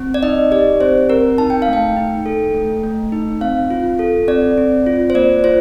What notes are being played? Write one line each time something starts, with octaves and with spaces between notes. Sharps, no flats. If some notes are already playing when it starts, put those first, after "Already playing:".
Already playing: C4
D5
D#4 D#5
G4 D5
C4 C5
C4 A#4
D#4 A5
G5
F5
A3
G5
D#4
A4
A3
A3
D#4
C4 F5
F4
A4
C4 D5
C4
F4
C5
A#3 D5
F4 C5